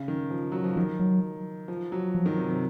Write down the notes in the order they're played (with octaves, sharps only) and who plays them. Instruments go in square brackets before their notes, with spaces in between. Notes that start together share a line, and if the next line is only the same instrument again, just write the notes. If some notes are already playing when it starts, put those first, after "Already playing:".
Already playing: [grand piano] C#3
D#3
F3
F#3
F3
[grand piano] D#3 [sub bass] F3
[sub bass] F#3
[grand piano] F3
F#3
[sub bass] F3
[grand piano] D#3
C3
C3